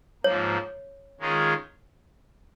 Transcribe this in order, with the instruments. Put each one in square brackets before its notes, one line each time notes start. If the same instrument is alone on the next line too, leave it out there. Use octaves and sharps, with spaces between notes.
[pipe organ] G#2 F3 A#3 [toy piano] C#5
[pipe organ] D#3 G#3 C#4 F4 G#4